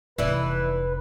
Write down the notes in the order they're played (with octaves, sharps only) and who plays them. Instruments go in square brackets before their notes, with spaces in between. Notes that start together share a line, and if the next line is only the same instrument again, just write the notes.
[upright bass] F1 D#4 [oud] E3 D4 [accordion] B4